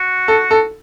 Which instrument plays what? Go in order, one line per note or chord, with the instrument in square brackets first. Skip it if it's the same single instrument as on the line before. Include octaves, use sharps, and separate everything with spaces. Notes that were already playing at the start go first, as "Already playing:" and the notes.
Already playing: [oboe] F#4
[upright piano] A4
A4